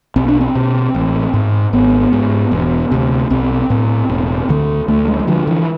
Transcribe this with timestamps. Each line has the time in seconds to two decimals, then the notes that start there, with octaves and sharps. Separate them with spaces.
0.16 B1 C4
0.28 D4
0.41 C4
0.55 B2
0.94 A1
1.34 G#2
1.73 G#1 B3
2.13 G#2
2.52 E1
2.92 D2 C3
3.30 B1 C4
3.70 A2
4.09 E1
4.49 D2 D3
4.88 D2 A3
5.08 G#3
5.20 G#3
5.27 D3 F3
5.47 E3